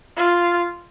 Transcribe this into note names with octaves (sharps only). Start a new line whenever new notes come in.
F4